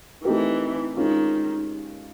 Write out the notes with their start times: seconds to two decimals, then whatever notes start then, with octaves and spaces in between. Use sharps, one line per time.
0.25 E3 A3 C4 D#4 G4 A#4
0.97 D#3 G#3 C#4 F4